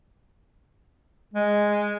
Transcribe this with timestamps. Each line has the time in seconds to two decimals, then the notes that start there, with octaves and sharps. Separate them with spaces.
1.34 G#3